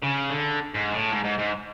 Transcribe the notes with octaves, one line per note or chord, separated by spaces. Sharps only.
C#3
D3
G#2
A2
G#2
G#2
G#2